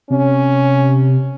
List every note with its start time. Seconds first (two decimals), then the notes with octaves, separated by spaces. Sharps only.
0.10 C3 C#4